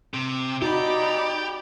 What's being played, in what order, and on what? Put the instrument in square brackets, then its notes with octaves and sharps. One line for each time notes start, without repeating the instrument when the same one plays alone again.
[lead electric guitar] C3
[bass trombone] D#4 [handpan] F#4 [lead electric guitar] G4 [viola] D5 B5